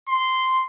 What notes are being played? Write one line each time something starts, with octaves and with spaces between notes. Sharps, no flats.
C6